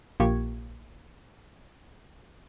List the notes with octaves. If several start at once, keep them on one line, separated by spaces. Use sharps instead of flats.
A#1 A#3 F4 G4 C#6 G#6